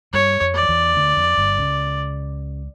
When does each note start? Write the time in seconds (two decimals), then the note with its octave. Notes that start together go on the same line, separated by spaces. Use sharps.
0.13 G2 G3 C#5
0.41 F2 F3
0.55 D5
0.63 F3
0.69 E2 E3
0.96 D2 D3
1.17 F2
1.37 G1 G2
1.58 C#2 C#3